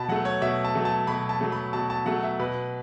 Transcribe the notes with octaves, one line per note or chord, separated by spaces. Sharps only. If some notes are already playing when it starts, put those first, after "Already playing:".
Already playing: B2 A5 B5
F#3 A3 F#5
C#5
B2 E5
A5
F#3 A3
A5
B2 B5
A5
F#3 A3
B5
B2 A5
A5
F#3 A3 F#5
E5
B2 B4